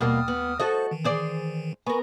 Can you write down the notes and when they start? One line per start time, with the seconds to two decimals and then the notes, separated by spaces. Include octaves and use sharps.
0.01 D#2 B2 G3 A#3 D#6 F6
0.28 B3
0.60 F#4 A4 C5 D#5
0.91 D#3 E3
1.04 G#4 C5 D5
1.87 B3 A#4 G#5 B5 C#6